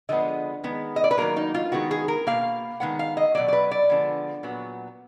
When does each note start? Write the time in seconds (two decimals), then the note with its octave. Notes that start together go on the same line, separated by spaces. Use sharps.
0.09 D3 F3 G#3 B3 D#5
0.64 D#3 G#3 B3
0.96 D#5
1.04 D5
1.11 B4
1.17 D#3 F#3 A#3 A#4
1.37 D#4
1.55 F4
1.72 D#3 G#3 B3 F#4
1.91 G#4
2.08 A#4
2.27 B2 A#3 F5
2.80 D#3 G#3 B3 F#5
2.99 F5
3.17 D#5
3.35 B2 F#3 A#3 D5
3.48 D5
3.53 B4
3.71 D5
3.89 D3 F3 G#3 B3
4.43 A#2 F#3 B3